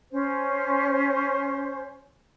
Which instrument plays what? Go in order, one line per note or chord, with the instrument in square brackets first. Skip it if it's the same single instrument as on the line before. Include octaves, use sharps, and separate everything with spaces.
[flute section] C#4 C5